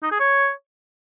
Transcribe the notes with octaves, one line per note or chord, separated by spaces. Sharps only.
D#4
G#4
C#5